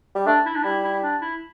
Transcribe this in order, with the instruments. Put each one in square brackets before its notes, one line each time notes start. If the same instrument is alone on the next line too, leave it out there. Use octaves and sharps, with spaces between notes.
[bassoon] G3
[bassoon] A3 [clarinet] D4
[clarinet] E4
D4
[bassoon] G3 [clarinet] E4
[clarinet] E4
D4
E4